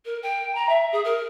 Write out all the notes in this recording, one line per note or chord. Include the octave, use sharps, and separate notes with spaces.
A#4
G5
A#5
E5
G#4
A#4